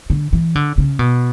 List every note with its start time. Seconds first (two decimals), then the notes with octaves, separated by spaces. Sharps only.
0.10 D3
0.33 E3
0.55 D3
0.78 C#3
0.99 B2